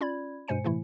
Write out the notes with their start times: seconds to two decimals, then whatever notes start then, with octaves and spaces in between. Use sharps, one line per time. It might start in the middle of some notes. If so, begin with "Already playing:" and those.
0.01 C#4 F4 D5 B5 G#6
0.48 G2 B2 G#3 C5 G#5 C#7
0.64 A2 C3 E3 A3 E4